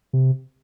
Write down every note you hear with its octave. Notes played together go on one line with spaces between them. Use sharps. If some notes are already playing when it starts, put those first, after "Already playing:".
C3